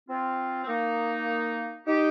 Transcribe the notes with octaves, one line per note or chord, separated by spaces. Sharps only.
C4 F4
C4
A#3 D#4
D#4 G4